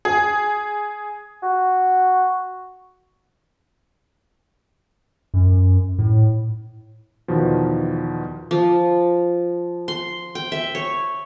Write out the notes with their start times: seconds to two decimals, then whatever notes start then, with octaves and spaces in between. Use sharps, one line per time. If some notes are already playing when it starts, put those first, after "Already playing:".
0.05 G#4
1.43 F#4
5.34 F#2
5.99 A2
7.28 E2 B2 D#3 F3
8.51 F3
9.88 C6
10.35 G5
10.52 E5
10.75 C#5